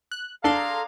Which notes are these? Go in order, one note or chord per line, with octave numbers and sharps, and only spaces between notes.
F#6
D4 G#4 A4 F5 A#5 C6